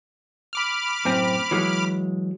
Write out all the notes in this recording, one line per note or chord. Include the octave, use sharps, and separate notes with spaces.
B5 D6 F6
F#2 A2 C4
E3 F#3 G#3